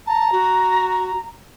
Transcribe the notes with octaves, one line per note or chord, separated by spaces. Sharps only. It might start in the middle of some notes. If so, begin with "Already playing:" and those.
A5 A#5
F#4